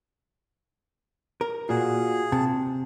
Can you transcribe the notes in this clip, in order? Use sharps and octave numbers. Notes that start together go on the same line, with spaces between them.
A#4
A#2 F4 F#4 G#4
C3 A5